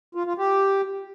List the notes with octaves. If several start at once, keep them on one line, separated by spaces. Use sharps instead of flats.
F4
F4
G4